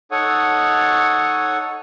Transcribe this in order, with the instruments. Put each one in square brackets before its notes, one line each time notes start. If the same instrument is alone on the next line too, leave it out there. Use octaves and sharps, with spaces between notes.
[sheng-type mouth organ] D#4 A4 C#5 F#5 C#6 D#6